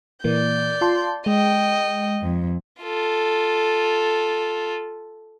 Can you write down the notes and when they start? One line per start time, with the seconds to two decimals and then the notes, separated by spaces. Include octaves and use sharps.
0.24 A#2 E3 A#3 D5 G6
0.81 F4 A5 C6
1.26 G#3 D#5 G5
2.21 F2
2.81 F4 A4